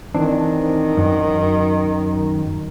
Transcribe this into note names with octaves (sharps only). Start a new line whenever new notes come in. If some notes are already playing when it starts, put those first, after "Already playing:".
D#3 E3 C4 D4
F#2 F#3